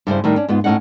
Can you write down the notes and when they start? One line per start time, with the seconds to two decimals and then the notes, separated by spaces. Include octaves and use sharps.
0.07 G2 C#3 E4 C5
0.24 A2 D#3 G3
0.36 C#4 D4
0.48 G#2 B3 F4
0.64 A2 C4 C#4 D#4 F#5